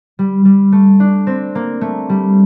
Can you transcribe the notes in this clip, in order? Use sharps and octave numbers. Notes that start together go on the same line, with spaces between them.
G3
G3
A3
D4
C4
A#3
A3
G3